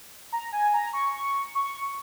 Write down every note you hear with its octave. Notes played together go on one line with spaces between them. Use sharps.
A#5
G#5
A#5
C#6
C#6
C#6